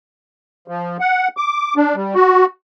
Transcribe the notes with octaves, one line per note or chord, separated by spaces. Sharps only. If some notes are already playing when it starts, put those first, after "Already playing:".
F3
F#5
D6
D4
G3
F#4